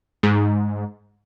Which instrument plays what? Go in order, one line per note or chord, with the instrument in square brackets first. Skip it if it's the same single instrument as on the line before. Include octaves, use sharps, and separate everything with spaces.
[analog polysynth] G#2